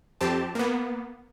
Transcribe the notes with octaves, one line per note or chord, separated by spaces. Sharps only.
F2 C4 G4 A5
A#3 B3